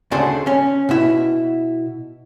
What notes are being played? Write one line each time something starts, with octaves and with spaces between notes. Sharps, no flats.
D2 C#3 D4 A4 C5
C#4
B2 E4